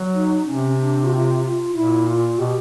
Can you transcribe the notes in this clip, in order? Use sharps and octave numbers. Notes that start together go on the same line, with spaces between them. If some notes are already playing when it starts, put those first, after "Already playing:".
Already playing: F#3
D#4
C3 C#4
D4
F#4
F4
F4
A#2 E4
F4
B2 G4